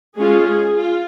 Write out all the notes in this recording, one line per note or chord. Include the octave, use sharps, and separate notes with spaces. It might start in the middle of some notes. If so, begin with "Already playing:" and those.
G#3 C#4 F4 G#4
G#4
F4